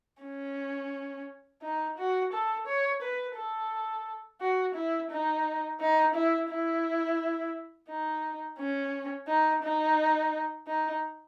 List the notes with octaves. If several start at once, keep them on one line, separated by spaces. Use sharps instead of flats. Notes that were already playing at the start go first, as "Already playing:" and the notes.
C#4
D#4
F#4
A4
C#5
B4
A4
F#4
E4
D#4
D#4
E4
E4
D#4
C#4
D#4
D#4
D#4